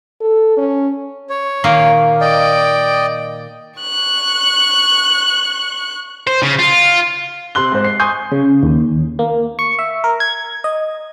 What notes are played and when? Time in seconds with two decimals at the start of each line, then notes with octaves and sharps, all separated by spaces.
0.21 A4
0.57 C#4
1.30 C#5
1.64 A#2 D#3 A#3
2.21 D5 D#5 G5
3.80 C#6 F#6
6.27 C5
6.43 C#3
6.59 F4
7.55 C3 C6 F#6 G7
7.72 G#2 C5
7.84 C7
8.00 G#5 C6 C#6 D#6 G6
8.32 C#3
8.63 D#2
9.19 A#3
9.59 C#6
9.79 E5
10.04 A#4
10.20 G#6
10.64 D#5